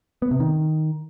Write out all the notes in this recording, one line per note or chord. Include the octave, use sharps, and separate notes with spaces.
B3
C3
D#3